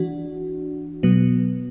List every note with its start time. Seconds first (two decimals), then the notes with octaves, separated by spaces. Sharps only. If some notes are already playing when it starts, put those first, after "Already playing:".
Already playing: E3 D4 F#4
1.03 B2 F#3 B3